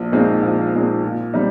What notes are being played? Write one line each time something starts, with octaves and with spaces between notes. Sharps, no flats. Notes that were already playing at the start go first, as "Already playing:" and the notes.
Already playing: A#1
A#2 G#3 C4 D#4
A#1
A#2 G#3 C4 D#4
A#2
G3 C4 D#4